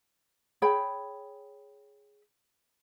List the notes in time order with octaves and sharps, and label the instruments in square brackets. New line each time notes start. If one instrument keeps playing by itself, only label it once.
[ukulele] G#4 C#5 G5 B5